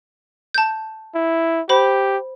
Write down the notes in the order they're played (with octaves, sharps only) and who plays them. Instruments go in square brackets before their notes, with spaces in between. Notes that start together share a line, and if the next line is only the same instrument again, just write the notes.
[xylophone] A5 G6
[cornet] E4
[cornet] G4 [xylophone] C5 B5